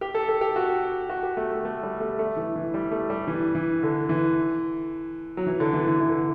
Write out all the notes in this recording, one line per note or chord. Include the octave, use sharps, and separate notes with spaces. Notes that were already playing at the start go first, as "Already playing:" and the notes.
G4
A4
A4
G4
F#4
F#4
G4
A3
A3
A3
G3
A3
A3
E3
E3
G3
A3
G3
E3
E3
D3
E3
F#3
E3
D3
E3
E3
E3
D3